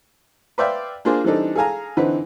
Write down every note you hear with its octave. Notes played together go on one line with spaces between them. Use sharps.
B4 C5 D5 E5 F5 G5
A#3 D4 F4 G#4 C5
E3 G3 C4 D4 D#4 A4
G#4 A4 F5 G#5 A#5
D3 E3 C4 D#4 B4